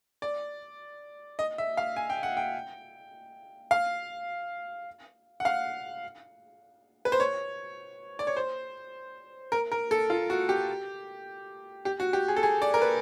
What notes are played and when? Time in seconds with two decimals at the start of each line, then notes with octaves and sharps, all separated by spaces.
0.22 D5
1.39 D#5
1.58 E5
1.77 F5
1.96 G#5
2.10 G5
2.23 F#5
2.37 G5
3.71 F5
5.40 F#5
5.45 F5
7.05 B4
7.12 C5
7.20 C#5
8.19 D5
8.27 C#5
8.37 C5
9.52 A#4
9.72 A#4
9.91 A4
10.10 F4
10.30 F#4
10.49 G4
11.85 G4
12.00 F#4
12.13 G4
12.28 G#4
12.36 A4
12.43 G#4
12.62 D5
12.74 A#4
12.82 B4